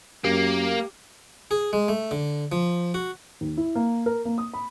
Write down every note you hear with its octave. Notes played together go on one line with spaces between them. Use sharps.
F#2 A#3 G4
G#4
G#3
A3
D3
F3
F#4
D#2
E4
A#3
A#4
A#3
D#6
B5